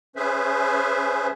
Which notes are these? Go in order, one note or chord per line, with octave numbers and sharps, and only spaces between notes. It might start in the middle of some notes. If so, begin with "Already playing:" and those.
C#4 G#4 B4 C5 E5